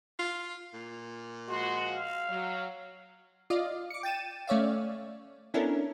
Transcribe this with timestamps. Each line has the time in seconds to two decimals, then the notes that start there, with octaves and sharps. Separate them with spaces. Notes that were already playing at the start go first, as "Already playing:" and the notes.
0.19 F4
0.73 A#2
1.49 F3 G#3 F#4 C6
1.88 F5
2.29 F#3
3.50 F4 D5 D#5 F5
3.90 D6 C#7
4.03 G5 A6 D#7 E7
4.47 A3 C#4 C#5 D5 E5 F5
5.54 B3 C#4 D4 E4 A4 A#4